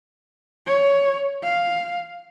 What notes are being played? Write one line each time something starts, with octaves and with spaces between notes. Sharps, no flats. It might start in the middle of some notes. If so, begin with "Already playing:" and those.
C#5
F5